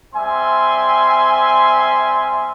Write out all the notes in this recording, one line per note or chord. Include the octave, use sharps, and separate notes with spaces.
G3 C4 E5 G#5 C6